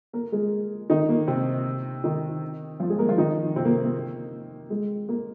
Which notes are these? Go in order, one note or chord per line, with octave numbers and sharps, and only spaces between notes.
A#3 A#4
G#3 G#4
D#3 D#4
A#3
C3 C4
D#3 D#4
F3 F4
G#3 G#4
A#3 A#4
F3 F4
D#3 D#4
C3 C4
A#3
A#3
G#3
A#3